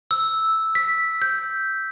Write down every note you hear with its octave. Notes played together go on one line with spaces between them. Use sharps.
E6
B6
G6